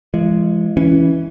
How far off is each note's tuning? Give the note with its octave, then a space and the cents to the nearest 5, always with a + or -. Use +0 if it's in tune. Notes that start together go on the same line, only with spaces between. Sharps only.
F3 -45 G#3 +0
E3 +0 C#4 +0